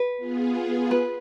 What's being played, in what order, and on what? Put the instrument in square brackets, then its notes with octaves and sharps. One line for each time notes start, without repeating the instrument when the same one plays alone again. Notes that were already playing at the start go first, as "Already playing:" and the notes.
Already playing: [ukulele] B4
[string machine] B3 F4 G#4
[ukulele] B4